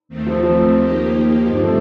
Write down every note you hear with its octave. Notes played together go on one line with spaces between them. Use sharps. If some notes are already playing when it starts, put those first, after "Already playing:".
D#2 D#3 A3 C4
F3
F3
D#2 D#3 A#3 D#4 G4
G2 D3 F3 G3 C4
A3